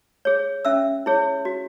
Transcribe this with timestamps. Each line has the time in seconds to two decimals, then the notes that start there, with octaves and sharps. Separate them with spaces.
0.25 G#4 C#5
0.65 C#4 E5 E6
1.06 E4 G#4 C#5
1.45 F#4